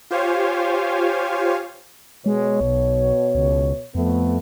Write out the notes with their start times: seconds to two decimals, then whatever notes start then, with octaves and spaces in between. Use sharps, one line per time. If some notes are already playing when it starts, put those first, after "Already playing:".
0.11 F4 G4 C5 C#5 F5 G#5
2.26 B2 G#3 C#5
2.61 B1
3.35 C#2
3.95 F2 A3 B3